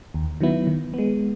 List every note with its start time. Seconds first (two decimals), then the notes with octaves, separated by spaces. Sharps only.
0.14 D#2
0.41 D#3 F#3 B3 E4
0.67 D#3
0.94 G#3 B3